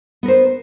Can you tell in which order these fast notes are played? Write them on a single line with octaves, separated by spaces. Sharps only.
B3 A#4 C5